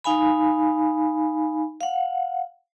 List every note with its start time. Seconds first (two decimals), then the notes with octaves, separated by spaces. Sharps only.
0.04 D#4 F5 G#5 B5
1.81 F5 F#5